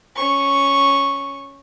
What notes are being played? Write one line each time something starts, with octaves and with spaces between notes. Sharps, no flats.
C#4 C#6